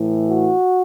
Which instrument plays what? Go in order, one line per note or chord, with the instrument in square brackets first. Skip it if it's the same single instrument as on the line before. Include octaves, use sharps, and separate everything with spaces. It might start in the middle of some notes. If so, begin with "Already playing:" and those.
Already playing: [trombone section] A2 E3
F#4